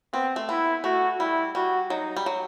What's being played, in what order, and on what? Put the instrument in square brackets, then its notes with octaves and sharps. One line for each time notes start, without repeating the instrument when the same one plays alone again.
[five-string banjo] B3 [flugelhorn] C4
[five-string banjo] A3
[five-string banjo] B3 [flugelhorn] E4
[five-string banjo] A3 [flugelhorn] F#4
[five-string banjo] G3 [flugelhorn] E4
[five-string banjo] G3 [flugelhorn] F#4
[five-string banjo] F#3 [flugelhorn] D#4
[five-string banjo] G3
F#3